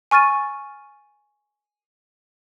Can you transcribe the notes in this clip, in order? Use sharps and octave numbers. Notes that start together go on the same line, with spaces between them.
G#5 C#6 F6 A6 D#7